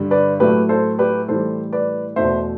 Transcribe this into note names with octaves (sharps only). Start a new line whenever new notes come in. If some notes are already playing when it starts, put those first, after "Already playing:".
Already playing: G2 D3 G3
B4 D5
A2 F#3 A3 G4 B4
A4 C5
G4 B4
A2 E3 G3 A4 C5
B4 D5
E2 B2 A3 C5 E5